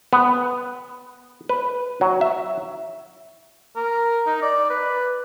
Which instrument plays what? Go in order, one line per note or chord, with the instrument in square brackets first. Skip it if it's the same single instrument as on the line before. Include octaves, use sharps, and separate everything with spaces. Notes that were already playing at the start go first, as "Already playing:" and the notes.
[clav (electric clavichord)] B3
B4
F#3
E5
[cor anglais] A#4
D#4
D5
B4